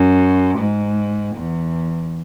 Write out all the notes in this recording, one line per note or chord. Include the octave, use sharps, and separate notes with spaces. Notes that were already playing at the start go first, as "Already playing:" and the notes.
Already playing: F#2
G#2
E2